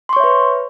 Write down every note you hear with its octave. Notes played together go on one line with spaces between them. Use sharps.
B4 C#5 E5 C6 C#6